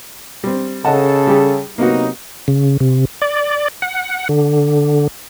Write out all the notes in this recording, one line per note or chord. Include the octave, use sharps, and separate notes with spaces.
G3 C4
C#3 A4 D#5 F#5 A5
G3 G4 G#4
C3 F#3 A#3 B3 D#4 F#4
C#3
C3
D5
F#5
D3